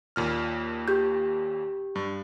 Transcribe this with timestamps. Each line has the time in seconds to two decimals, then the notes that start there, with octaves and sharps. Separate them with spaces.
0.16 D#2 A#2 F6
0.88 G4 G6
1.95 G2